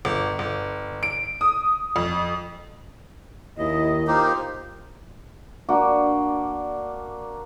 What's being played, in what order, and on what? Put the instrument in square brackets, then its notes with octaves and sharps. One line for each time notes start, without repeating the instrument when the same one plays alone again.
[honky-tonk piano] G1
G1
D7
D#6
F2
[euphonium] D#2 [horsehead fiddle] E4 [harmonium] D#5
[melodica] A#3 D#4 G4 [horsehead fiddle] F4 [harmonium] A#4 C5
[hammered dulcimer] A#3 D4 F#4